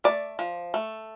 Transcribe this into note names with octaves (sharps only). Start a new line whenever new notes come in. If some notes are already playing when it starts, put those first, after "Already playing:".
A3 D5
F3
A3